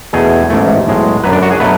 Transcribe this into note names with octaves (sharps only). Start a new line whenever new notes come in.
E2 B2 A3 G#4
A1 G#2 E3 A3
B1 A2 G#3
F#2 D3 F#3 B4
D4
F#4
G#4
B2 F#3 A3 B4